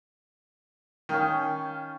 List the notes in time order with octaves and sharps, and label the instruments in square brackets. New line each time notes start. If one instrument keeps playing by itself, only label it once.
[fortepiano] D#3 [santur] C#4 F5 G5